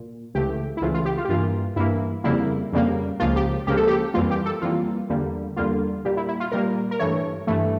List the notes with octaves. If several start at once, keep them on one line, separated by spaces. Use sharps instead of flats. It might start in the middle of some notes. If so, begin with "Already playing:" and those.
Already playing: A#2
C#2 C#3 E3 A3 G4
E4
C#2 C#3 E3 A3 F4
F4
G4
F4
G4
G2 E3 A#3 F4
G2 E3 A#3 E4
F2 C#3 G3 A#3 E4
F2 C#3 G3 A#3
C#2 C#3 F3 A#3 F4
G4
C#2 C#3 F3 A#3 G4
A4
G4
F2 E3 G3 A#3 F4
G4
A4
F2 E3 G3 A#3 F4
E2 D3 G3 A#3
E2 D3 G3 A#3 F4
A#2 G3 A#3 G4
E4
E4
F4
A#2 G3 A#3 A#4
A#4
G2 E3 A3 C#5
G2 E3 A3